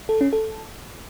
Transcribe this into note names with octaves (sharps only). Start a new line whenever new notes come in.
A4
C#4
A4